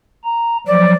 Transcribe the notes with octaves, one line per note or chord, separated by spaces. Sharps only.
A#5
F3 F#3 D5